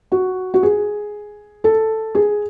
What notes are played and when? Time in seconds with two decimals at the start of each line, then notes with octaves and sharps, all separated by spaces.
0.12 F#4
0.54 F#4
0.63 G#4
1.64 A4
2.15 G#4